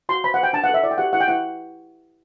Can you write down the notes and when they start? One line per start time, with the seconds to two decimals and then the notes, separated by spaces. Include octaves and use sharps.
0.09 F#4 C6
0.24 C5 B5
0.34 F#5
0.39 C5 G5
0.53 D4 A5
0.64 F#5
0.69 A4 E5
0.83 E4 D5
0.91 G5
0.98 G4 F#5
1.13 E4 F#5
1.21 G5
1.28 E4 F#5